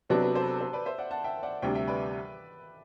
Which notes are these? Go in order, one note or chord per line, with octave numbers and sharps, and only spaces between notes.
C3 F#3 B3 D4 F#4 A4 C5
G4 B4
A4 C5
B4
A4
A4 C5
B4 D5
C5 E5
D5 F#5
F#5 A5
E5 G5
D5 F#5
D2 C3 G3 E5 G5
E5 G5
B4 D5